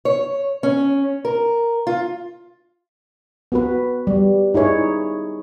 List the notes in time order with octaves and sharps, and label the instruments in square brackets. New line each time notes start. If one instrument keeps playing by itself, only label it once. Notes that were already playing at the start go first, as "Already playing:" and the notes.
[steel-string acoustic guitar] C#5
C#4
A#4
F4
[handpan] B3 F#4 B4
G3
D#4 E4 G#4 C#5